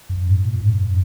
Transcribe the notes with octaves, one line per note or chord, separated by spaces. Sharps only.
F#2
G#2
A#2
F#2
G#2
F#2